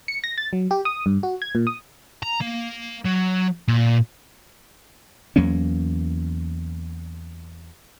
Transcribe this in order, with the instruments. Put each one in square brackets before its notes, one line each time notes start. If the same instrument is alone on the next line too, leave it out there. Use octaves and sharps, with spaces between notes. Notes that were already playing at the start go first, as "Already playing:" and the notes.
[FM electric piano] C#7
A#6
A6
F#3
G4
D#6
G2
F#4
G#6
A#2
D#6
[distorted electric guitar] A#5
A#3
F#3
A#2
[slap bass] E2 F#3 A#3 C#4